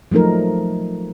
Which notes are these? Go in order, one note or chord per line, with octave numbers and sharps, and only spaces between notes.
F3 F#3 A3 D#4 A#4